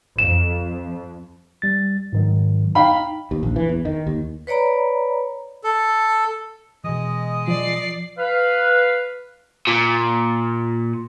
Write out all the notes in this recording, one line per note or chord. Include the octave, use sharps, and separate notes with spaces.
F2 E7
G3 A6
G#2 D#3 F#3
D#4 F5 G5 B5
D#2
A#1
E3
E2
D#3
D#2
B4 C#5 D5 A#5 B5
A4
B2 E3 G#3 D#5 D#6
F3 D5 C7
B4 F5
A#2